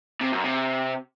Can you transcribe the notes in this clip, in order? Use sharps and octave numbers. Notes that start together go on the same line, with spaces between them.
C3
F#2
C3